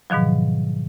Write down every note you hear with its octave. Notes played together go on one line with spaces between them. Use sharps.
G#2 B2 D#3 F3 F#3